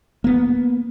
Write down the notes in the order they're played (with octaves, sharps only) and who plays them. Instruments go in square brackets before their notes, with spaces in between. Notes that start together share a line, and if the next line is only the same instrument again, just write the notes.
[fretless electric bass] A#3 B3